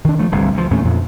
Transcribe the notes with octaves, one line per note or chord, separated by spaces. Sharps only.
D#3 D4
F3 A3
G1 C2 D3
D2 F3
E2 A#2 A3 C#4
F2 A#2 F3